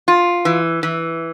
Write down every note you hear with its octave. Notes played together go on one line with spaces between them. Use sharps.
F4
E3
E3